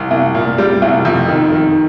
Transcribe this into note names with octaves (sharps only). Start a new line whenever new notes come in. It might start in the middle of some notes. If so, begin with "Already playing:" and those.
Already playing: C2
C2
A#2
G3
C2
F2
D#3
D#3